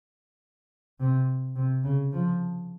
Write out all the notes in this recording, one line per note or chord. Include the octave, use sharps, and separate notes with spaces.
C3
C3
C#3
F3